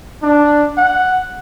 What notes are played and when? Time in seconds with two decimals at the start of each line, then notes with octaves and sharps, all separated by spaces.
0.23 D4
0.77 F#5